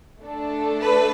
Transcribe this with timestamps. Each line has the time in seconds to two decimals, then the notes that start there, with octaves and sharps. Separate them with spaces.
0.22 A3 D4 A4
0.81 B4